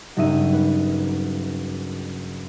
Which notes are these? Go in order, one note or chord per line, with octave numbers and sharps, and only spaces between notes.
F#1 G2 D#4 E5 D#7 E7
B4